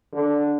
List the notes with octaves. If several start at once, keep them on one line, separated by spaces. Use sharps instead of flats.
D3